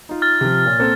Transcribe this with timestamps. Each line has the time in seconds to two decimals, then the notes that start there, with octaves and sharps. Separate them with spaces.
0.09 D#4 F4
0.22 F6 A6
0.41 C3 F3
0.66 A#2 C#5
0.79 A#3 C4 A4